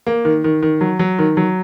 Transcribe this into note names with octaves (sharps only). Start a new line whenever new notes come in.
A#3
D#3
D#3
D#3
F#3
F#3
D#3
F#3